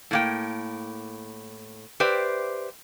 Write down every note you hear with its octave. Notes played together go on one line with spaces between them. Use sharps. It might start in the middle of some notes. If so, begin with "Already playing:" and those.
A2 A#3 G5
G4 B4 C5 D5 E5 G5